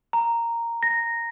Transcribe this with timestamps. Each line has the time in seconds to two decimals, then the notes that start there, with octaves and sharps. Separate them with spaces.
0.13 A#5
0.83 A#6